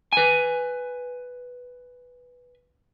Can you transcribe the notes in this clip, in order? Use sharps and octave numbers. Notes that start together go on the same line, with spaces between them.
B4 G#5